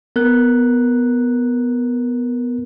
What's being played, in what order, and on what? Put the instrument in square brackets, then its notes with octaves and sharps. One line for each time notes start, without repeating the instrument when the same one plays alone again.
[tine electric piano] B3 A#4 F#6